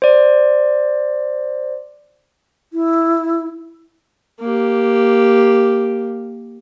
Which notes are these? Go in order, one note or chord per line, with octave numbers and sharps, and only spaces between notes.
C5 D5
E4
A#3 G4